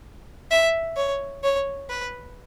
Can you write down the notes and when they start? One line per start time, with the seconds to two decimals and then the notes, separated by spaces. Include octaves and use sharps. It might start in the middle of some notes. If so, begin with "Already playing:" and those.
0.51 E5
0.97 C#5
1.43 C#5
1.89 B4